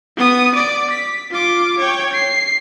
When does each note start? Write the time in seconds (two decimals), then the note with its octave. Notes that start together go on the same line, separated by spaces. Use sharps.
0.17 B3 D#6
0.55 D5 D6
0.91 B6
1.31 F4 D6
1.79 C#5 G5
2.13 C7